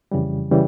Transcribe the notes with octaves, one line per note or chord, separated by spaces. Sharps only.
F2 C#3 E3 G3
C#3 E3 G3